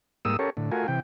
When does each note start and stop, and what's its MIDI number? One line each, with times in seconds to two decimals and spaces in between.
0.25 0.37 44
0.25 0.37 55
0.25 0.37 58
0.25 0.37 87
0.25 0.37 88
0.39 0.50 61
0.39 0.50 67
0.39 0.50 69
0.39 0.50 70
0.39 0.50 73
0.57 0.71 45
0.57 0.71 50
0.72 0.87 57
0.72 0.87 65
0.72 0.87 66
0.72 0.87 70
0.72 0.87 80
0.88 1.00 48
0.88 1.00 52
0.88 1.00 79